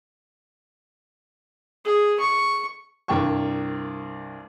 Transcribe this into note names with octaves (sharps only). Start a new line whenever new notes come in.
G#4
C#6
C2 G2 A#3 G5 A5 C#6